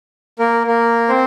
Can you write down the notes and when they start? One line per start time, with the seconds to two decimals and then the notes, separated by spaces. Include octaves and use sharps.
0.39 A#3 A#4
0.67 A#3 A#4
1.09 C4 C5